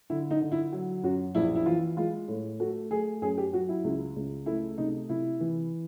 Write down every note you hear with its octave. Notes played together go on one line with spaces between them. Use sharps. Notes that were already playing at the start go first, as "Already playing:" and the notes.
D3 E4
D#4
D3
E4
F#3
F#2 F#4
A#1 E4
E4
E3 F4
G#3 F4
A2
A3 F#4
A3 G#4
F#2 G#4
G4
F#3 F#4
E4
C#2
C#2
A3 E4
C3 D#4
C3 E4
E3